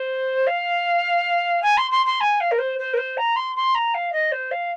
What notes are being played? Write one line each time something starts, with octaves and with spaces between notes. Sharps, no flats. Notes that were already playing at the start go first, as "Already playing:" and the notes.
Already playing: C5
F5
G#5
C6
C6
C6
G#5
F5
A#4
C5
C5
A#4
C5
A#5
C6
C6
A#5
F5
D#5
C5
F5